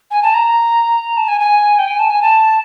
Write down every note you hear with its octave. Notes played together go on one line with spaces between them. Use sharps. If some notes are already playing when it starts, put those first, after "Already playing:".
G#5
A5
A#5
A5
G#5
G#5
G5
G#5
A5
G#5
A5